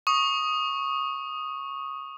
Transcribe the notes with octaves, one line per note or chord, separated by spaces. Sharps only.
C#6 D#6